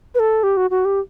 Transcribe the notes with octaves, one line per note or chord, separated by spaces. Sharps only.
B4
A4
G4
F#4
F#4
G4